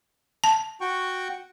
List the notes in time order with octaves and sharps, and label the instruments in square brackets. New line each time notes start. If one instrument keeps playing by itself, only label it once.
[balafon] A5
[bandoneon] F#4 G5 C#6